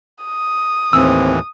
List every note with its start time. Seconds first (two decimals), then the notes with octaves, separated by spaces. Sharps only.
0.24 D#6
0.93 D#2 A2 E3 C4 E6